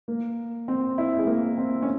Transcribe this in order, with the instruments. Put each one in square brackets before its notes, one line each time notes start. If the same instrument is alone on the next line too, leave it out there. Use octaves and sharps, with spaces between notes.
[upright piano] A#3
C4
E4
G#3
A#3
C4
C#4